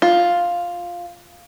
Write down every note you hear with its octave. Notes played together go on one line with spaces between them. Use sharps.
F4